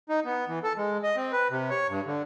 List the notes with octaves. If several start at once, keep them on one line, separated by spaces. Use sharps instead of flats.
D#4
B3
E3
A4
G#3
D#5
C4
B4
C3
C#5
G2
D3